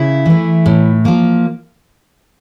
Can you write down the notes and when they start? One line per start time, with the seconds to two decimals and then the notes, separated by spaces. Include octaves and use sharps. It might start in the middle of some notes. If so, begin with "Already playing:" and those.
Already playing: C#3 E4
0.26 E3 A3
0.66 A2
1.05 F3 A#3